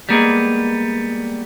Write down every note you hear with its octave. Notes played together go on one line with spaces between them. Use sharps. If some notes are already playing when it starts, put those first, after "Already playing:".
G3 G#3 A#3 B3 G#4